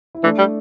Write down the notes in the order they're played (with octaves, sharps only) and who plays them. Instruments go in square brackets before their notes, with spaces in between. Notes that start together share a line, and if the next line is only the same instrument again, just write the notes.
[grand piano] E4
[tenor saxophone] E3 [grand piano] A3 D4
[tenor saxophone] G3